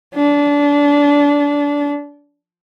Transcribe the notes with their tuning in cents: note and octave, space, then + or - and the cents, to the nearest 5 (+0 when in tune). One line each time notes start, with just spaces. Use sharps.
D4 -25